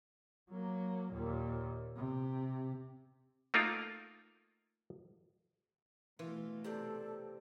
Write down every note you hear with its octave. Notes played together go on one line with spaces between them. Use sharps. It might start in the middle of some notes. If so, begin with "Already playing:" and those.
F#3 A#3
D#2 A#2
C3
A3 A#3 D#4 F4 A#4
B2 E3 A3 F4
C3 C4 A4 D5